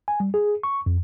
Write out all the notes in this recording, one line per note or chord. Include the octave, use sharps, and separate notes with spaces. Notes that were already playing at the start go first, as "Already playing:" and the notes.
G#5
G3
G#4
C#6
F2